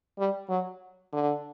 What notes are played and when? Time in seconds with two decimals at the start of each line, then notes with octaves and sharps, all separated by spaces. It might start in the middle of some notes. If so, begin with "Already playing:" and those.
0.19 G3
0.49 F#3
1.13 D3